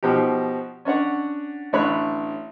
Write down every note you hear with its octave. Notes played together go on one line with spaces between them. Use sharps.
B2 F3 D#4 G4
C#4 D4 C#5 F#5
A1 D3 C#5 B5 F#6